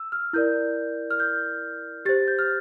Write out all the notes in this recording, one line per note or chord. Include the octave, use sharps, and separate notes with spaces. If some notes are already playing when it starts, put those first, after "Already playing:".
Already playing: E6
F6
E4 A#4 D5 G6
F6
G6
G4 C5 A6
G6
F6